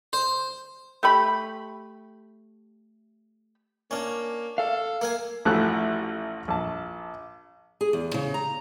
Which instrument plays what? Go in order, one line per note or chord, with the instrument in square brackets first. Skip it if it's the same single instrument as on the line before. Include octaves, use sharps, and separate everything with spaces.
[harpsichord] C5
[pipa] A3 G4 B5
[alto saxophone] A#3 [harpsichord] C#4 D4
[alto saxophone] A4 [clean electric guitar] F5
[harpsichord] A#3 F5 G#5
[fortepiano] A1 F3 A3 E4 F#4 F#6
A#1 A5
[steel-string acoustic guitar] G#4
E2
C#3
A#5